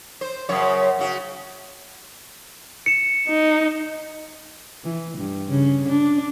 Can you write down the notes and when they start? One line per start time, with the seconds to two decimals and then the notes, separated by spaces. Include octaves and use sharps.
0.21 C5
0.49 F#2 C#3 C#5
0.99 C#3 F#4
2.86 C#7 E7
3.28 D#4
4.84 E3
5.18 G2
5.50 C#3
5.88 D4